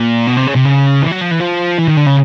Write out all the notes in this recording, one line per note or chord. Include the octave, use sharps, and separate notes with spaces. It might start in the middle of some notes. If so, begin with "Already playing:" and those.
Already playing: A#2
B2
C3
C#3
C3
C#3
E3
F#3
F3
E3
F3
E3
D#3
D3
C#3